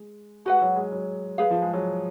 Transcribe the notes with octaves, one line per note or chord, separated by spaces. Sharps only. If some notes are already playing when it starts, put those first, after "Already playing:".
Already playing: G#3
G#3 F#4 B4 F#5
F#3
G#3
F#3
G#4 B4 F5
F3
G#3
F#3